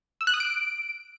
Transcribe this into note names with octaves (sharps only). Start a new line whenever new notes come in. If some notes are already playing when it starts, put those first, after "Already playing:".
E6
F#6
D#6
D7